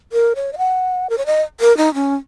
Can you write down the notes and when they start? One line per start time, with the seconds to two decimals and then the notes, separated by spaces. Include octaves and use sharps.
0.12 A#4
0.36 C#5
0.53 D#5
0.58 F#5
1.10 A#4
1.18 C#5
1.26 D#5
1.60 A#4
1.77 D#4
1.94 C#4